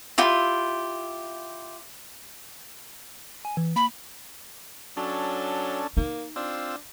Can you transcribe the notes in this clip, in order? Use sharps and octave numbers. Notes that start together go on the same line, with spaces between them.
E4 F4 G4
G#5
E3
A#3 B5
F#3 C#4 D4 A4
A#3 D#4
C4 D4 F4 E6